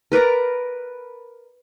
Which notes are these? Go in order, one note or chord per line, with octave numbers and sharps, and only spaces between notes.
A#4 B4 D5 A#5